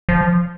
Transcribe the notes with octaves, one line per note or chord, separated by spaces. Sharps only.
F3